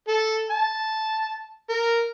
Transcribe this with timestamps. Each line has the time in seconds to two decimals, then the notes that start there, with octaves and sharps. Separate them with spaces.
0.08 A4
0.50 A5
1.69 A#4